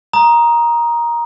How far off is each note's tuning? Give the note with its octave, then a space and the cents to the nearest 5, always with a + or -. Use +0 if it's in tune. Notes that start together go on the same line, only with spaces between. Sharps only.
A#5 +10 D#6 +0